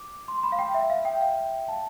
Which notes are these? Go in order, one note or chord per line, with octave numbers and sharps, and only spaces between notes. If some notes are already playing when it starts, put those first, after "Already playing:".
Already playing: D6
C6
B5
F5
G5
E5
F5
G5
F5
A5